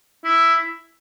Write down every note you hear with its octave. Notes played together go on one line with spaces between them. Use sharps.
E4